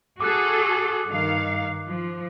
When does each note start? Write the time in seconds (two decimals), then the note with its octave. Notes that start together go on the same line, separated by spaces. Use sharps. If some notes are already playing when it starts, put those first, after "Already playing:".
0.21 F#4 G#4 A4 D6 F#6
1.08 G2 D#3 F5
1.88 F3